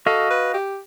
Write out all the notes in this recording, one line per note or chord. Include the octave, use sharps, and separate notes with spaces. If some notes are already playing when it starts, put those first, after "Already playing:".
F#4 A4 D#5 F5
B4
G4